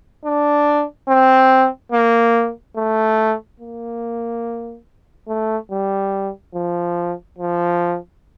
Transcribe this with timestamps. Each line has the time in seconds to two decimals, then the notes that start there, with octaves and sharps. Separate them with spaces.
0.25 D4
1.09 C4
1.92 A#3
2.76 A3
3.60 A#3
5.28 A3
5.71 G3
6.54 F3
7.38 F3